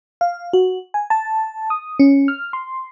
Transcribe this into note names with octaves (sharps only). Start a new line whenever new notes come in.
F5
F#4
G#5
A5
D#6
C#4
F6
C6